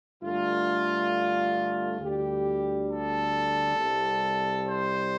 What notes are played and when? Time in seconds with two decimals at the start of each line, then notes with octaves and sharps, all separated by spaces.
0.22 G2 D3 A3 F4
2.00 D2 D3 G3 G4
2.89 A4
3.78 C2 C3 G3
4.66 C5